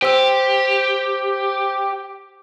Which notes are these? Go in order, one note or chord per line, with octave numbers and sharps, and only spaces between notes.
G4 C5 E6